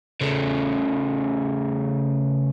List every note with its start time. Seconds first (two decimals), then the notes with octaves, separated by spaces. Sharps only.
0.21 C#3 A3